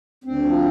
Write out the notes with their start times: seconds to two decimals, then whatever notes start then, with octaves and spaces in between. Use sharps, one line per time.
0.24 D2 C4
0.44 F3